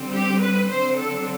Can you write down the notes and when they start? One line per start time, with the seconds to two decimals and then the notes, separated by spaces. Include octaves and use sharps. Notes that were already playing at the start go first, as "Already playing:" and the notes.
Already playing: D3 G3 C4
0.11 G4
0.40 B4
0.68 D3 F#3 C4 C5
0.97 A4